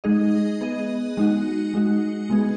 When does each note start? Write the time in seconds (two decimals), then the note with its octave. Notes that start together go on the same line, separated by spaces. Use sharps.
0.04 G#3 D#4 G#4 D#5
0.61 B3 G#4 D#5
1.17 G#3 D#4 F#4
1.74 G#3 D#4 F#4
2.30 G#3 B3 D#4 G#4